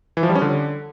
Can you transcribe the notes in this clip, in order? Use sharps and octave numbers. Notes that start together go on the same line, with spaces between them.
E3
F3
G3
C#4
D3